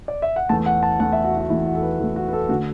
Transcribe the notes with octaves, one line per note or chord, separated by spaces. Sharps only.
D5
E5
F#5
E2 E3 A3 A5
F#5
A5
E2 E3 A3 F#5
E5
F#4
F#4
E2 E3 A3 E4
F#4
A4
B4
E2 E3 A3 A4
F#4
B4
A4
D3 A3 F#4